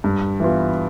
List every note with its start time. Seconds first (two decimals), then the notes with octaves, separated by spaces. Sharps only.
0.04 G2
0.40 E3 B3 F4